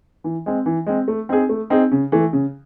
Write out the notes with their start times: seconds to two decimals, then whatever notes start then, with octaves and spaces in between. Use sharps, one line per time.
0.24 E3
0.46 G#3 C4
0.66 E3
0.86 G#3 C4
1.08 A3
1.29 C4 D#4 G#4
1.49 A3
1.70 C4 D#4 G#4
1.91 C#3
2.12 E3 A3
2.33 C#3